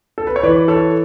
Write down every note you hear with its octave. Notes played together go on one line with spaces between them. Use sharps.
A4
B4
C#5
E3 B4 D5
A4 C#5